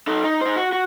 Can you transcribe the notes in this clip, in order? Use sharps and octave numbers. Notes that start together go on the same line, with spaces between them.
D#4 A4
D#4
D#4 C5
F#4
F#4